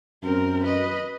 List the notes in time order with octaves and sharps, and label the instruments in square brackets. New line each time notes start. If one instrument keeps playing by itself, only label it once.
[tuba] F#2 [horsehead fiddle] C4 A#4
[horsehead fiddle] B4 D#5